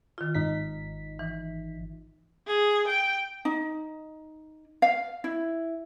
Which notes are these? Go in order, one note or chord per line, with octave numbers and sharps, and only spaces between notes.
D#3 F4
G#1 D#4 B6
E3
G#4
G5
D#4
F5
E4